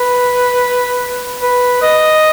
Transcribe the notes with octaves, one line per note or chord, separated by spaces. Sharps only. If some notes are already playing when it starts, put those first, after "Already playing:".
Already playing: B4
B4
D#5